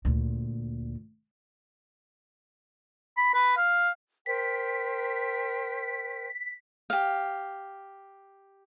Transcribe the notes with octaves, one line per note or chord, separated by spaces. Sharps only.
D2 A#2
B5
B4
F5
A#4 C5 G5 B6
G4 F5